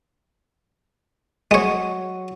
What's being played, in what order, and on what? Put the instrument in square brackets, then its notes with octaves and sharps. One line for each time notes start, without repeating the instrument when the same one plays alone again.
[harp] F#3 [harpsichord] G#3 C#5